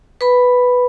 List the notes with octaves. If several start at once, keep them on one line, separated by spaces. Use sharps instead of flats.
B4 B5